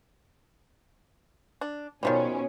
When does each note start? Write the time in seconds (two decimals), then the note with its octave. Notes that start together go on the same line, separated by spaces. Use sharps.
1.61 D4
2.03 B2 D#3 F3 G3 C#4